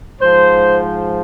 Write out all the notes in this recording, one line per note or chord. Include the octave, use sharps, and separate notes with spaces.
G#2 F3 C5